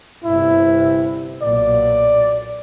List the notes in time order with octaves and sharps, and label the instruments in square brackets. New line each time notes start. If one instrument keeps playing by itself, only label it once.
[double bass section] G1 C3 [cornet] E4
[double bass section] B1 A#2 F#3 [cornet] D5